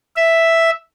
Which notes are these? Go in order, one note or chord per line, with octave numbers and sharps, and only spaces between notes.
E5